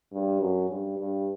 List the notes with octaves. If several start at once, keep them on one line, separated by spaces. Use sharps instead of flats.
G2
F#2
G2
G2